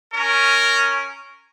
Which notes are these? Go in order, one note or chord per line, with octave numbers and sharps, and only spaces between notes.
C#4 A#4